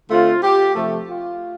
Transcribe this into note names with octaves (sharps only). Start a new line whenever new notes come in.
D3 A3 C4 F4
G4
C3 F3 A3
F4